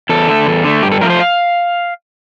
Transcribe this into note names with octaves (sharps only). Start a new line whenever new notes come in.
E2 A4
D3 A3
E2
D3 A3
G2 G4
A4
F3 A3 A#4
C5
F5